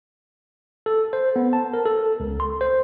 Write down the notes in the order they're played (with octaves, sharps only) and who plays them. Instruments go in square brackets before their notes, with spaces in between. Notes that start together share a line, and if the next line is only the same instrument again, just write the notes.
[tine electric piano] A4
C5
B3
A5
A#4
A4
C#2
C6
C5